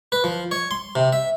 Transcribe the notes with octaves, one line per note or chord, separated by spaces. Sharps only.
B4
F3
C#5
C6
C3
E5